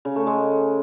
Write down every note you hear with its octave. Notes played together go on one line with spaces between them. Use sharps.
C#3
A3
G#3